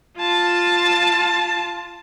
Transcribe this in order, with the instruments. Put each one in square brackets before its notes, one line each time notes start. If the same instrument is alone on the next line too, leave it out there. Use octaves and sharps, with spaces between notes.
[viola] F4 A5